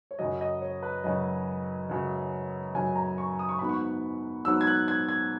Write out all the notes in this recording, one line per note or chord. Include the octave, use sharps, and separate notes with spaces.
C#5
F#2 C#3 F#3 D#5
D#5
C#5
B4
F#2 C#3 F#3 D#5
F#2 C#3 F#3
F#2 C#3 F#3 G#5
A#5
C#6
D#6
C#6
G#2 F#3 B3 B5
C#6
G#2 F#3 B3 E6
G#6
F#6
G#6
G#6